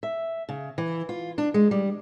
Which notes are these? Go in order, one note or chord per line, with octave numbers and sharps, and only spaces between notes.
E5
C#3
E3
F4
D4
G#3
G3